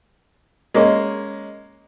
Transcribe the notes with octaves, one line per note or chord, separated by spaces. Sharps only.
G#3 A#3 C#4